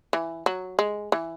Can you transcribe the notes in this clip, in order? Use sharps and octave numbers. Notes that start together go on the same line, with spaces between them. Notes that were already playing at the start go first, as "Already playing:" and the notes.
E3
F#3
G#3
E3